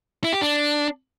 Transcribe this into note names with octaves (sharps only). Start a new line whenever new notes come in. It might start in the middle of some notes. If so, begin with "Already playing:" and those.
E4
G4
D4